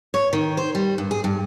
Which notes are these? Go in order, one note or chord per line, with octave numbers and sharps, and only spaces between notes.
C#5
D#3
C5
G3
G2
G#4
G2